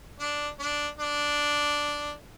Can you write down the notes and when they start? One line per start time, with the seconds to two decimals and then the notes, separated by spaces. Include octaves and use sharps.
0.20 D4
0.60 D4
0.99 D4